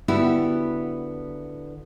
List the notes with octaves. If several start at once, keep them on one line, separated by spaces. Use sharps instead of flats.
D3 B3 E4 F#4 G4